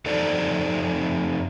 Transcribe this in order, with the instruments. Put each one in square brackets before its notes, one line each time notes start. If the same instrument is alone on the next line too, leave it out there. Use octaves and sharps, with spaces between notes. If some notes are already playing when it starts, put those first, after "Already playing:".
[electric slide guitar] F2 D#4 A4 C5 D5